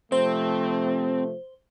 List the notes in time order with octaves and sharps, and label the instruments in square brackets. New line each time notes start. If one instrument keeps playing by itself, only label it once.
[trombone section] C3 F3 A3 [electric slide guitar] C4 [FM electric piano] C5